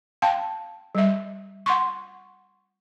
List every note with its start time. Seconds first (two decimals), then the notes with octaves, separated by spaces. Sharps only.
0.22 F5 G5 A5
0.95 G3 E5
1.66 F#5 C6 C#6